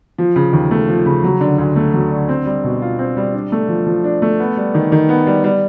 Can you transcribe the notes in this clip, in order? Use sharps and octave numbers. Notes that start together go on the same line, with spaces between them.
F3
C#3
D#2
A3
F3
C#3
F#3
D3
D2
A3
F#3
D3
C4
G3
B2
F4
C4
G3
D4
A3
F3
F3
D4
A3
B3
G3
D#3
D#3
B3
G3
G3